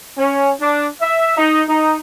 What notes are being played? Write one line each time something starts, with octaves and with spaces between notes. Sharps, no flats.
C#4
D4
E5
D#4
D#4